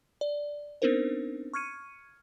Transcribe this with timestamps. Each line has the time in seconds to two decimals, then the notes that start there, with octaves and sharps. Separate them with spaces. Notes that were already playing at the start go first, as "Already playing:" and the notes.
0.21 D5
0.82 B3 C4 D4 D#4 A#4 C5
1.54 C#6 F6 G#6 C#7 D#7